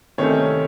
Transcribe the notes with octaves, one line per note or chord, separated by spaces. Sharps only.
C3 D#3 A3 C#4 C#5